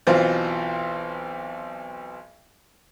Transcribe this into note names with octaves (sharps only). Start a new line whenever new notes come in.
B1 B2 E3 C4 F4 C5